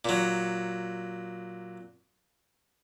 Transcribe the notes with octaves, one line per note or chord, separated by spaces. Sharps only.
A#2 F#3